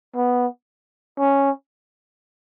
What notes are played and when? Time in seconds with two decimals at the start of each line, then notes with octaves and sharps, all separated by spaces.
0.15 B3
1.19 C#4